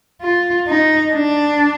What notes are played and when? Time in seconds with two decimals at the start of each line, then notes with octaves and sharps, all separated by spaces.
0.22 F4
0.68 D#4
1.13 D4